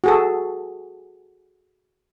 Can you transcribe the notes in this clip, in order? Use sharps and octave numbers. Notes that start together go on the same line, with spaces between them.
F#4 G#4 A4